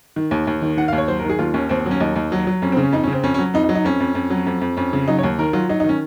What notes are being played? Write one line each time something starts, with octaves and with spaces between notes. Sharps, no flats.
D#3
D#2
D#2
D#3
D#3 F#5
F5
D#2
C#5
F#3 C5
A#4
D#3
G#4
D#2 F4
D#2 C#4
D#2 C4
C4
F#3
C#4
D#2 D#4
D#2
F#3
F#3
F2 C#4
C4
C#3
C#4
F2 D#4
C#4
C#3
C4
F2 C#4
C#4
F#3
F2 D#4
D#4
F#3
D#4
F2 C#4
F2
F2
F#3
F2
F2
F2 C#4
C#3
F#3 D#4
C#5
D#2
D#3 A#4
F#3 F4
F#3 D#4
D#4
D#3
C#4